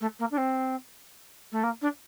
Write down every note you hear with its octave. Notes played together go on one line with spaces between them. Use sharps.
A3
A#3
D4
C4
A3
A#3
D4